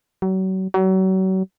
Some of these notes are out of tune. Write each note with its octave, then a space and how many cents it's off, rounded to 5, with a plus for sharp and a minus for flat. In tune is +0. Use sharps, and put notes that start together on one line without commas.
F#3 +35
F#3 +35